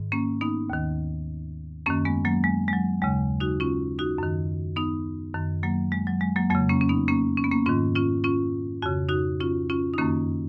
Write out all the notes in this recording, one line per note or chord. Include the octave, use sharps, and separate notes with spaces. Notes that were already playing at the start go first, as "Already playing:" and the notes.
Already playing: G#2 D#3
A#3 C#4
B3 D#4
D#2 D#3
F#2 D#3 A#3 C#4
G#3 B3
F#3 A#3
G#3
G#3
F#3
D#2 C#3 G#3
D#4 F#4
C#4 F4
D#4 F#4
F#2 D#3
B3 D#4
F#2 D#3
F#3 A#3
G#3
F#3
G#3
F#3 A#3
F2 C#3 F#3 A#3
A#3 C#4
C#4
B3 D#4
A#3 C#4
C#4
B3
A#3 C#4
G#2 D#3 C#4 F4
C#4 F4
C#4 F4
F2 C#3 F#4
D#4 F#4
C#4 F4
C#4 F4
D#4
F#2 D#3 A#3 C#4